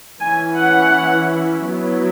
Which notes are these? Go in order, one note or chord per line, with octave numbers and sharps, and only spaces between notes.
E3 C#4 E4 G#5
F#5
F#3 B3 E4